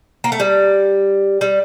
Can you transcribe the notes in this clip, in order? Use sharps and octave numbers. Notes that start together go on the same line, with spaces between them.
A#3
A3
G3
G3